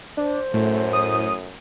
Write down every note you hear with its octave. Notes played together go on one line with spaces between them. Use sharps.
D4 C5
F#2 A2 A3
D#6